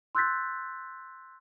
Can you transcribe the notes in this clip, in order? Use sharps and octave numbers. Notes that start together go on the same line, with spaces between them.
C6 E6 F#6 G6 A6 B6